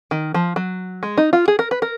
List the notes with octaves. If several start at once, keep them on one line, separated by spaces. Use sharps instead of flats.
D#3
F3
F#3
G#3
D#4
F4
G#4
A#4
B4
A#4